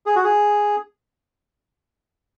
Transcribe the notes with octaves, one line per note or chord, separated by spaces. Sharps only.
G#4
F#4
G#4